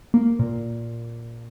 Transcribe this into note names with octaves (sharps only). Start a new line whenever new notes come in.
A#3
A#2